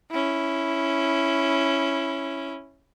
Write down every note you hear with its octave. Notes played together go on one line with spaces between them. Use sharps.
C#4 E4